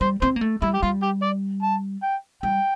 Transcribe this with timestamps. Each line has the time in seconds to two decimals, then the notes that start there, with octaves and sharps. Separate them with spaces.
0.01 G3 C5
0.22 C4 C5
0.36 A#3
0.41 A3
0.62 G3 E4
0.74 G4
0.82 G3 F4
1.02 G4
1.22 D5
1.62 A5
2.03 G5
2.43 G3 G5